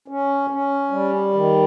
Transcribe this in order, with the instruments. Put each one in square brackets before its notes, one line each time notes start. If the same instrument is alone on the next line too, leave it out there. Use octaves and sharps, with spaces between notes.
[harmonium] C#4
C#4
G3
D#3